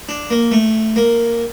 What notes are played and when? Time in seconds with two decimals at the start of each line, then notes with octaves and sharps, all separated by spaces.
0.09 D4
0.30 A#3
0.52 A3
0.96 A#3